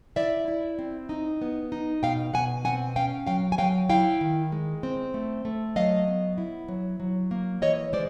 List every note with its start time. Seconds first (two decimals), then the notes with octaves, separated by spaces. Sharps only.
0.16 E4 D5 E5
0.48 E4
0.79 C4
1.09 D#4
1.42 B3
1.72 D#4
2.03 B2 F5 G5
2.34 B2 F#5 G#5
2.64 C4 F#5 G#5
2.96 C#4 F5 G5
3.27 F#3 F5 G5
3.52 G#5
3.58 F#3 F5 G5
3.89 E4 F5 G5
4.21 D#3
4.52 G#3
4.83 C4
5.14 A3
5.45 A3
5.76 F#3 D#5 F5
6.07 B3
6.38 E4
6.68 F#3
7.00 F#3
7.31 A#3
7.62 E3 C#5 D#5
7.93 G#3 C5 D5